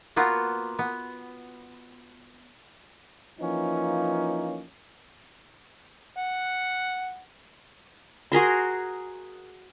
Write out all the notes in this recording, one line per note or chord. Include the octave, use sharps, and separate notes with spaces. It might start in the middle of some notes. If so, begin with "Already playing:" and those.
A#3 B3 F4 F#4
B3
E3 F3 A#3 C#4 D#4
F#5
F#4 G#4 A#4 C6